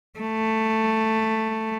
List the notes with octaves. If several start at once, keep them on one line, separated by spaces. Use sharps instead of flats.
A3